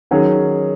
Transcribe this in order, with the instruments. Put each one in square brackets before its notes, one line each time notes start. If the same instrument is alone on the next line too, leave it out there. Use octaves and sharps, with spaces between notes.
[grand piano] D#3 F#3 C#4 G#4